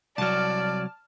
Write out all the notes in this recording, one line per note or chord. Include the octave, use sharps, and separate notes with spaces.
C2 F#3 D5 A5 F6